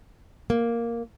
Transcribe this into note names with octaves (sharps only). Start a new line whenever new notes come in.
A#3